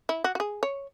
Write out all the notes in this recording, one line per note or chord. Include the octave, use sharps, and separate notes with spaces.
E4
F#4
F#4
G#4
C#5